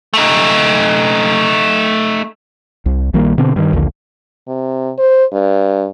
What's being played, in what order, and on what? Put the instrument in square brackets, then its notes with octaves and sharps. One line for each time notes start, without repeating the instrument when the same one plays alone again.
[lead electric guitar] A3 D#4
[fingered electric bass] C2
A#1 D#3 G3 A#3
B2 D3 C4
G2 D#3
A#1 D#2 D3
[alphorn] C3
C5
G2